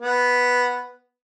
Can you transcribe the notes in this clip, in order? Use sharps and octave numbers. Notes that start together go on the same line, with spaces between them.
B3